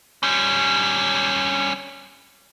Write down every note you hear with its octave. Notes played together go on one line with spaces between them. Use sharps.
G3 C#4